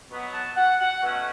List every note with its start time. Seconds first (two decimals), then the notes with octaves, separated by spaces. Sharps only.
0.11 B2 F#3 B3
0.34 A5
0.56 F#5
0.79 F#5
1.02 B2 A3 C#4 F#5